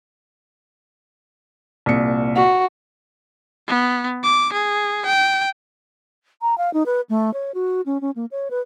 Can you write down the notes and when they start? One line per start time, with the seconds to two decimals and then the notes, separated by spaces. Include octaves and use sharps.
1.86 C2 A#2 C#7
2.36 F#4
3.68 B3
4.23 D6
4.53 G#4
5.06 G5
6.42 A#5
6.58 F5
6.73 D#4
6.86 B4
7.09 A3
7.33 C#5
7.54 F#4
7.86 C#4
8.01 C#4
8.16 A#3
8.31 C#5
8.50 B4